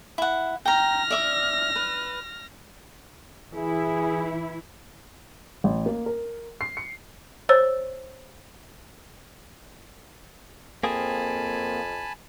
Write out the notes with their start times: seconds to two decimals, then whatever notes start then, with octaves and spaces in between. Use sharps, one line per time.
0.18 E4 F#5
0.65 G5 A#5 F6 A#6
1.10 D5 E5 D6
1.76 B4
3.55 E3 E4 G#4
5.64 A1
5.86 A#3
6.06 A#4
6.61 C7
6.77 C#7
7.49 C5 C#5 E6 A6
10.83 F2 A#3 C4 G#4 G#5 A5 B5